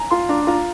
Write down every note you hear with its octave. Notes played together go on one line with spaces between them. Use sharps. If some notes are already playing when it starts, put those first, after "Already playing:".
Already playing: G#5 A#5
F4 C6
D4 A#5
F4 A#5